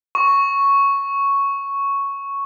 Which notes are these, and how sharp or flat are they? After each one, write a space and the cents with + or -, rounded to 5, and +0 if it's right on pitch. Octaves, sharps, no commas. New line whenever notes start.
C#6 +0